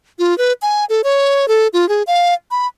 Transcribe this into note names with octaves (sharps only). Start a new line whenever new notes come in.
F4
B4
G#5
A4
C#5
A4
F4
G#4
F5
B5